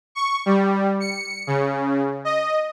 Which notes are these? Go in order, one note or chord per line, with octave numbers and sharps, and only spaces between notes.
C#6
G3
C#7
C#3
D#5